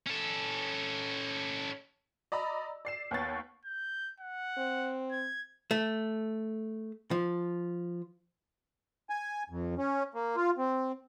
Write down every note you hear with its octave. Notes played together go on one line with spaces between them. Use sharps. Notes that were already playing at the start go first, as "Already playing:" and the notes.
C#4 A4
D5 D#5 A#5 B5 E6
D5 C7 E7
D#2 B3 C#5 A6
G6
F#5
C4
G#6
A3
F3
G#5
F2
C#4
A#3
F4
C4